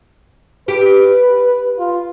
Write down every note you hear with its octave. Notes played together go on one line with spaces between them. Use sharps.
G4 B4
F4